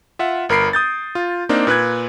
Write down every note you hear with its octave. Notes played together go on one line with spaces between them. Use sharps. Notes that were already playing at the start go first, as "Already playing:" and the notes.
F4 E5 F#5
G1 A#4 B5 C7 D7
D#6 G6 A6
F4
A#3 C4 D4 D#4
A#2 B4 F#6 G#6